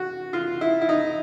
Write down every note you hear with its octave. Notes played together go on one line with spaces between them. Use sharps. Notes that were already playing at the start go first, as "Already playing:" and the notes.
Already playing: F#4
F4
E4
E4
D#4